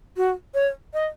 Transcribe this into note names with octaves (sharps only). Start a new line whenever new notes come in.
F#4
C#5
D#5